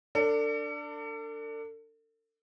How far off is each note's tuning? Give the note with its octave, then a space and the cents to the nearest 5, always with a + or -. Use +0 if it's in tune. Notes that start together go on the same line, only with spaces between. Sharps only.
D4 +0 A4 +40